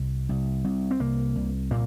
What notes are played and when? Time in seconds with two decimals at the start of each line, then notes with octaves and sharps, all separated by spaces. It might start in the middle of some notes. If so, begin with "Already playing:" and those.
Already playing: C2
0.29 C2
0.64 C2
0.91 C4
1.00 C2 A#3
1.35 C2
1.71 A#2 A#3